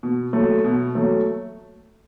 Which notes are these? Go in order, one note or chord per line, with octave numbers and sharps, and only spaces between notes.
B2
F#3 A3
B2
F#3 A3